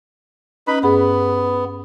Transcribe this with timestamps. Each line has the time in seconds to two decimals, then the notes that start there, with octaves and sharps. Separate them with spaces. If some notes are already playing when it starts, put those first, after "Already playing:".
0.67 C#4 D#4 B4 B5
0.83 G2 B3 G#4 B5